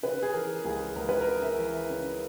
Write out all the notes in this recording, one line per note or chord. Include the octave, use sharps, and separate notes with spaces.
C#3 B4
G#4
E3 A#4
C#2 G#4
C#2 A#4
B4
A#4
C#3
E5
E3
C#3